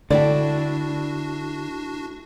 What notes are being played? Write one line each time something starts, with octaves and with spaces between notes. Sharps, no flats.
D3 A3 D4 E4 F#4 D5 G5